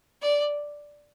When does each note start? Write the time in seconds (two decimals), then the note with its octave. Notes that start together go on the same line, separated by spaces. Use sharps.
0.22 D5